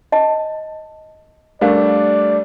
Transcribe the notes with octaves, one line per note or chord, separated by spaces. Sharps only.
D#5 A5
G3 A3 D4 G4 A#4 D5 F5